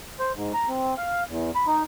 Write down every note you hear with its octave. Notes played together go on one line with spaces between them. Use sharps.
C5
G#2
A#5
C4
F5
E2
B5
D#4